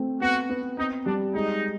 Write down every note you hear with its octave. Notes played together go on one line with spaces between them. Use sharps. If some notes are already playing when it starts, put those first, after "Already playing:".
Already playing: A3 C4
B3 F#4
B3
C4 D#4
G3 D4
G#3 D#4